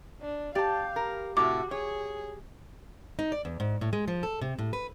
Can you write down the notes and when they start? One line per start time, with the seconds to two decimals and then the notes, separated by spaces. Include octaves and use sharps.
0.21 D4
0.55 G4 D5 F5 A5
0.96 A#4
1.37 A2 C3 A3 F#4 D6
1.71 G#4 C#5
3.19 D#4
3.32 D5
3.45 E2
3.60 G#2
3.81 A2
3.93 G#3
4.08 F3
4.23 A4
4.41 C3
4.59 A2
4.73 B4